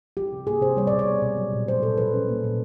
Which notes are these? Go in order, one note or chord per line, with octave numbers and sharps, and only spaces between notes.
F3 G4
C3
A#3 G#4
C3 C5
G3 C#5
B2 D5
C#5
B3
B2
F#3
A#2
A3 C5
A#2 A4
F3 B4
C#4
A#3
A#2